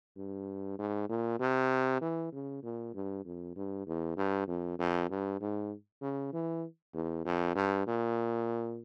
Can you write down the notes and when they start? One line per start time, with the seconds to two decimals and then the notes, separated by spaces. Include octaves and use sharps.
0.17 G2
0.79 G#2
1.09 A#2
1.40 C3
2.01 E3
2.32 C#3
2.63 A#2
2.94 G2
3.25 F2
3.56 G2
3.87 E2
4.17 G2
4.47 F2
4.79 F2
5.10 G2
5.41 G#2
6.01 C#3
6.33 E3
6.94 E2
7.25 F2
7.55 G2
7.87 A#2